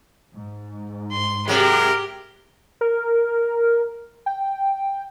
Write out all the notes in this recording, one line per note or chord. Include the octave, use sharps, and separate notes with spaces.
G#2
C6
C3 F#3 G#3 G4 A#4
A#4
G5